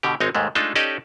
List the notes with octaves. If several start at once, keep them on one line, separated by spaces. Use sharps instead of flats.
B2 D3 G4
G#1 G#3 C4 D#4 C#5
D#2 G#2 G#3 A3
G#3 A3 D4 D#4 F4 A4
C#4 D#4 G4 A4 D5 D#5